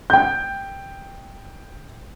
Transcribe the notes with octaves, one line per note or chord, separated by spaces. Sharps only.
G5 G6